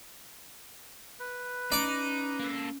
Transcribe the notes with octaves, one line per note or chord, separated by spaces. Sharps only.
B4
C#4 D#4 D5 D6
A#3 A4